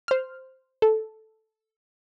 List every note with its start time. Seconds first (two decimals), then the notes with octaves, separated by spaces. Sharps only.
0.08 C5 F6
0.82 A4